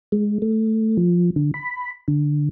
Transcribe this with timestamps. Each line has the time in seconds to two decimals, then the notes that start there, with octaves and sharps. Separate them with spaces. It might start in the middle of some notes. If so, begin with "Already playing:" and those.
0.12 G#3
0.42 A3
0.97 F3
1.36 D3
1.54 B5
2.08 D3